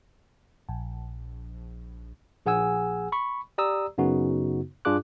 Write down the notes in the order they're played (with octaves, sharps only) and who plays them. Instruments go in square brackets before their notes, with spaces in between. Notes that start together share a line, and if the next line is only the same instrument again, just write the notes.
[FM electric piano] A#1
[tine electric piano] A#1 G#4 F#5 G#5 E6
B5 C#6
G4 D5 A#5 D#6 E6
F#2 C#3 B3 D#4 F#4
G2 D4 F4 G#4 D6 F#6